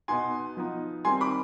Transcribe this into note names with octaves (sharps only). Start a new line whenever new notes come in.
B2 B3 D#4 G#5 C6
F3 B3 D#4
D#3 G3 C4 D#4 G#5 C6
B5 D6